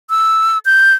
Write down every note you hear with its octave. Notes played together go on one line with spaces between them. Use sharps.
E6
G6